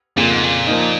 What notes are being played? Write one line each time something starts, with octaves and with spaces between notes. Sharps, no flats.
F2 A#2 C#3 A#3 F4
G#2
A#2
F3 A#3 D#4